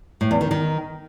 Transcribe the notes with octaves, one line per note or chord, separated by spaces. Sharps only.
A2
E2
D#3
D#3